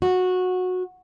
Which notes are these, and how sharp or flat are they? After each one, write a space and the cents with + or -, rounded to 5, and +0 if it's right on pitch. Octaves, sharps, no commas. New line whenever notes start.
F#4 -15